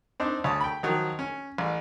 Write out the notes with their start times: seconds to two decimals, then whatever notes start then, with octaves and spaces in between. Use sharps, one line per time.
0.20 C4 D4 D#4
0.44 D2 C#5 A5 D#6
0.61 G5 B5
0.83 D#3 F3 F#3
1.19 C#4
1.58 A1